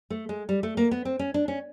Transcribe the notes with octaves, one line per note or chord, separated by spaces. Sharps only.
A3
G#3
G3
A3
A#3
B3
C4
C#4
D4
C#4